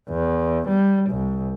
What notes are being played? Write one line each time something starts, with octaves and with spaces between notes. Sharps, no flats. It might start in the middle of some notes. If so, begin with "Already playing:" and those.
E2
G3
C2